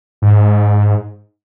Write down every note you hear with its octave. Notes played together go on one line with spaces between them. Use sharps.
G#2